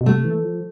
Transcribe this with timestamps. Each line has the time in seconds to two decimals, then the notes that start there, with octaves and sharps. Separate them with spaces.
0.01 B2
0.06 C3 A3
0.25 E3
0.44 F3